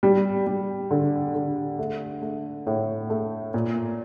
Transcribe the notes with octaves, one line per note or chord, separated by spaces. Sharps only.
G3
G3
D3
D3
A3
A3
A2
A3
A#2